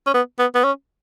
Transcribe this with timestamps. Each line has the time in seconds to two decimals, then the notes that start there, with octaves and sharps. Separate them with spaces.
0.07 C#4
0.14 B3
0.39 B3
0.55 B3
0.64 C#4